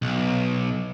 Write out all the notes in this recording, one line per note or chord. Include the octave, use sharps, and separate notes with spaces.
B1